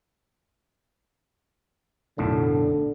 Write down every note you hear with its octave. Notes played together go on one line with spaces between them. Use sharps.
B1 F#2 A2 D3